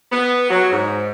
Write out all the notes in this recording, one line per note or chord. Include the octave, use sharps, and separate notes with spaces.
B3
F#3
G#2